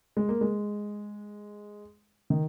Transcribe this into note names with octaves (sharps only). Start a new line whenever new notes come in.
G#3
A#3
G#3
D#3